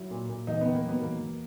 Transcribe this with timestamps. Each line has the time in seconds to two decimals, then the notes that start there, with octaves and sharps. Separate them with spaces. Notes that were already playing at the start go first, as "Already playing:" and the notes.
Already playing: F#3 E4
0.11 A#2
0.29 A#2
0.47 E2 D#4
0.61 D#3 B3
0.75 A#3
0.84 F#3 B3
1.01 E2 A#3
1.20 E2